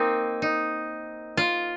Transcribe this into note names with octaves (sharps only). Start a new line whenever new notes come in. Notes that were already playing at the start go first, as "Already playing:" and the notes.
Already playing: A#3 C4 D#4
D#4
F4